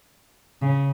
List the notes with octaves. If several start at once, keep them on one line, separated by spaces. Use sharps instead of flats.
C#3